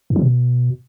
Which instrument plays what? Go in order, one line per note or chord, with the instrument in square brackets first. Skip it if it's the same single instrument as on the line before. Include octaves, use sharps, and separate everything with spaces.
[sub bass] G#2
F3
B2